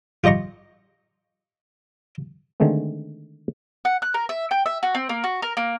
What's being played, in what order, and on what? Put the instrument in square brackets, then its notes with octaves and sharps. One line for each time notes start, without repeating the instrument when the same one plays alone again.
[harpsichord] F4 G4 D#5 A#5 C#6
[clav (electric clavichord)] D3 D#3 G#3 A3 C4
[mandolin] F#5
F#6
A#4
E5
G5
E5
F#4
C4
A#3
F#4
A#4
A#3